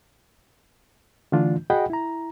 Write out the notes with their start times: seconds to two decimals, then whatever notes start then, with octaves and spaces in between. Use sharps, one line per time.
1.32 D3 E3 A3 D4 F4
1.70 F#4 G#4 D#5 F#5 G5 B5
1.90 E4 A#5